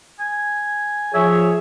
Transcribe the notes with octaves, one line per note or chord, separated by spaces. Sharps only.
G#5
F3 G#4 C#5 E5